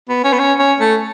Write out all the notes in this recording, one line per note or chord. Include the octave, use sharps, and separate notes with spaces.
B3
C#4
B3
C#4
C#4
A3